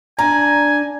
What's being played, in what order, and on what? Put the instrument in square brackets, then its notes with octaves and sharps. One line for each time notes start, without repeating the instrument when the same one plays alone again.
[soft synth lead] D4 [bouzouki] D5 [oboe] G#5 [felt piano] A#5